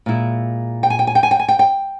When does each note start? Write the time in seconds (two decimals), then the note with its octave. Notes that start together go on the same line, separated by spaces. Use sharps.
0.06 A#2 G#3 E4
0.83 G5
0.90 G#5
0.99 G5
1.07 G#5
1.15 G5
1.23 G#5
1.31 G5
1.39 G#5
1.48 G5
1.59 G5